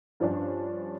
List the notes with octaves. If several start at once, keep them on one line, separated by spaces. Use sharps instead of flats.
G2 F3 C#4 D4 C#5